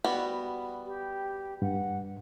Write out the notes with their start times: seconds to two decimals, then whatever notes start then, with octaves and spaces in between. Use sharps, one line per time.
0.04 G3 B3 F#4
0.87 G4
1.62 G2 F#5